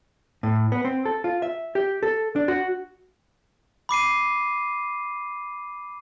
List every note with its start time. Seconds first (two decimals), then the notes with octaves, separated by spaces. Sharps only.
0.43 A2
0.72 B3
0.85 C4
1.06 A4
1.24 F4
1.42 E5
1.75 G4
2.03 A4
2.36 D4
2.48 F#4
3.89 B5 D6 C7 D#7